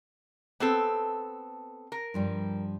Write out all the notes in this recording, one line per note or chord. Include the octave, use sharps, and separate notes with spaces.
B3 C4 A4
A#4
G2 F3 G3